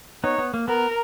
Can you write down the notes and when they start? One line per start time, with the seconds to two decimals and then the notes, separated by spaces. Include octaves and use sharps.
0.24 B3 D#4 C#5
0.38 B3
0.54 A#3
0.68 B3 A#4